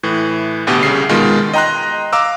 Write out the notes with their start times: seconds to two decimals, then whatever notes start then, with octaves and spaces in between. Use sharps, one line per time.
0.03 A2 E3
0.67 A1 D2 B2 G4
0.83 C2 C#3 C7
1.09 B2 D#3 G#3 F4
1.54 D#5 G5 A#5 C6 F#6
2.13 F5 A#5 D6 E6